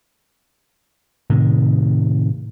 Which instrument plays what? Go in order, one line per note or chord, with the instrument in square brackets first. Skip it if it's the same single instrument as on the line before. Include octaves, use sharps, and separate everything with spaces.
[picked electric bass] A2 C3 D#3